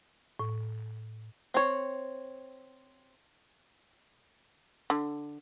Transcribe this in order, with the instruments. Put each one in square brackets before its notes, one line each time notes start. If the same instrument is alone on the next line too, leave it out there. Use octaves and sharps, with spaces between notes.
[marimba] A2
[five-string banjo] C4 C#5
[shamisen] D3